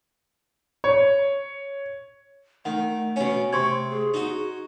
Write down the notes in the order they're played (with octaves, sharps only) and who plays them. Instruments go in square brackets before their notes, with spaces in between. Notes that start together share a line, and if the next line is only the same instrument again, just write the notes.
[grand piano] C#5
[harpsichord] D#3 [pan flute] A3 [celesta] F#5
[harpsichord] B2 C#4
[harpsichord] C3 [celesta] C6 C#6 G#6
[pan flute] G#4
[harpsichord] D#4 F#4